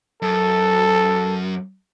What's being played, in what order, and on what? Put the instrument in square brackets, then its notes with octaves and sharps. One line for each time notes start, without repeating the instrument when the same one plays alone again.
[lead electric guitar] F#2 [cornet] A4